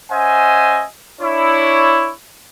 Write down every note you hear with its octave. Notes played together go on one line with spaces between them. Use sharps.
C#4 C5 D#5 E5 F#5 G#5
D4 E4 C#5